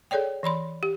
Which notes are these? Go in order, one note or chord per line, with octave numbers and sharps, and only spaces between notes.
G#4 A4 C#5 D5 G5
E3 D5 B5 C6
G4